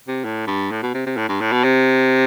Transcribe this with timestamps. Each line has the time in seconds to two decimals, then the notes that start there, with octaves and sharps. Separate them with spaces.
0.08 C3
0.24 A2
0.47 G2
0.71 A2
0.83 B2
0.94 C3
1.06 C3
1.17 A2
1.28 G2
1.41 A2
1.52 B2
1.64 C3